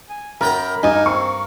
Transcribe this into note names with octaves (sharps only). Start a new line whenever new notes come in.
G#5
F#2 A#4 G5 A#5 B5
G2 D#4 G#5
C4 C#6